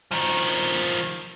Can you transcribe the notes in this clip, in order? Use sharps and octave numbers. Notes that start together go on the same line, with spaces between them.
D#3 F3